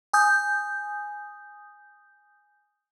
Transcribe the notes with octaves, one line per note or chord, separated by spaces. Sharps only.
G#5 D#6 G6